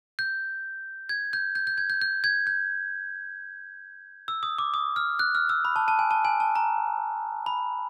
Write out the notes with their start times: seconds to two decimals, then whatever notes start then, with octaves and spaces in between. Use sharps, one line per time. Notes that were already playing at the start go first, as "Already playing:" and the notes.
0.19 G6
1.09 G#6
1.33 G6
1.55 G6
1.67 G6
1.78 G#6
1.90 G6
2.01 G6
2.24 G#6
2.47 G6
4.28 E6
4.43 D#6
4.58 D6
4.74 D#6
4.96 F6
5.19 F#6
5.35 F6
5.49 E6
5.65 B5
5.76 A5
5.88 A5
5.99 G#5
6.11 A5
6.25 G#5
6.40 A5
6.55 A#5
7.46 B5